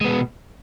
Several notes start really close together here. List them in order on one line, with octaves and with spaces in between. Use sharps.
G#3 B3 B2